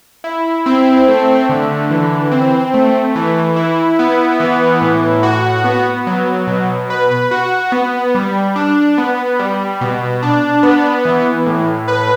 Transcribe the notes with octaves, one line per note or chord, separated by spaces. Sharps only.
E4
C4
A3
D3
E3
C4
A3
E3
E4
B3
E3
A2
F#4
B3
F#3
B2
B4
F#4
B3
G3
D4
B3
G3
B2
D4
B3
E3
A2
B4